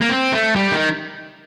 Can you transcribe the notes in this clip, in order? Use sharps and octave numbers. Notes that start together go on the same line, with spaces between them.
A#3
C4
A3
G3
D#3